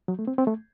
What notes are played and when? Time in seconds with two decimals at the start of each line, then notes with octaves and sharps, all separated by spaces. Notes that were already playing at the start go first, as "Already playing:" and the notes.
0.08 F#3
0.19 A3
0.27 C4
0.38 C4
0.47 A3